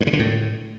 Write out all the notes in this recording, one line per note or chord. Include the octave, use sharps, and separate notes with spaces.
G2
C#3
D3
A2